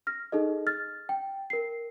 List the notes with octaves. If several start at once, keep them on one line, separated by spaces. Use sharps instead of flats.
F6 A#6
D#4 G#4 A4 D#5
F6 A6
G5
A#4 C7